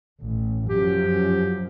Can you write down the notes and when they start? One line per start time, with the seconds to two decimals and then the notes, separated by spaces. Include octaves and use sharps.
0.21 A1
0.70 F#2 F3 G4